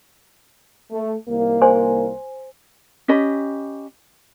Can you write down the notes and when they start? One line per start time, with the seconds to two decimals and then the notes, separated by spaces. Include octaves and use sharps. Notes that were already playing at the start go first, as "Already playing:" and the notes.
0.92 A3
1.28 C2 D#3 A#3
1.62 C5 G#5 C6
3.08 C#4 G4 D#5 B5